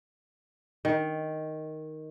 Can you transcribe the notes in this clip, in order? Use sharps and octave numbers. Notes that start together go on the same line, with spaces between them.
D#3